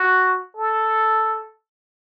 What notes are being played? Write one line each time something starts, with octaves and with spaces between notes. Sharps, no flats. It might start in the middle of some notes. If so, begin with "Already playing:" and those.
Already playing: F#4
A4